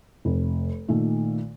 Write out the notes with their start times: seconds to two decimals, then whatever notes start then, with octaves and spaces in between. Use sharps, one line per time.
0.25 F1
0.88 A#2 D#3 A3